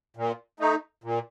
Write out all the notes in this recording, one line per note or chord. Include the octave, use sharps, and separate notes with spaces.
A#2
A3 D#4
A#2